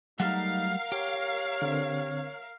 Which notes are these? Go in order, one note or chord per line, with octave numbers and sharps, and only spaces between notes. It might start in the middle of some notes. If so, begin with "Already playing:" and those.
F#3 G3 A3 D#4 A#4 F5 F#5
G4 C#5
D3 C4